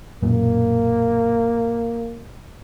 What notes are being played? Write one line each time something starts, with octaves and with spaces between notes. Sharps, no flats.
B1 F#2 A#2 A#3